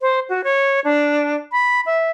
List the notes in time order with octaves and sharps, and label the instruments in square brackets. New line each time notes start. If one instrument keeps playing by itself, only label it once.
[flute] C5
F#4
C#5
D4
B5
E5